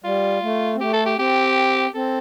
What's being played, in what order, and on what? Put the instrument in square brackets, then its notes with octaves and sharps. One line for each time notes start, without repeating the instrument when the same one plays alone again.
[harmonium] G3 [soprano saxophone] F4
[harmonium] A3
C4
[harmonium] A3 [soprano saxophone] G4
[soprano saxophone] A4
G4
[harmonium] C4 [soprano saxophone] G4
[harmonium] C4 [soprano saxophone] A4